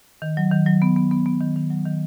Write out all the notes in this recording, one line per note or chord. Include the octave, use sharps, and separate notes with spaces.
D#3
F#3
D#3
F#3
B3
B3
B3
B3
D#3
D#3
F#3
D#3